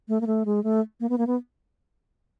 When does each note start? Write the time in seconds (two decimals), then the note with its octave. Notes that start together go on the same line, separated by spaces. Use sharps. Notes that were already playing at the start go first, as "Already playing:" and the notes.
0.08 A3
0.21 A#3
0.27 A3
0.45 G#3
0.64 A3
1.00 A#3
1.09 B3
1.18 A#3
1.27 B3